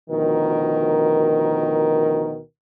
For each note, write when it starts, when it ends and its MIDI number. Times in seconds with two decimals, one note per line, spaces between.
0.10 2.39 38
0.10 2.39 47
0.10 2.39 51
0.10 2.39 53
0.10 2.39 70